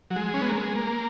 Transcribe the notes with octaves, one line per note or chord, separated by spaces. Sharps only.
F#3
G#3
C#4
B3
A#3
G#3
A#3